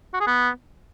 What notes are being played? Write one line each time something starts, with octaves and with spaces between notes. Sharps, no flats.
F#4
G#4
B3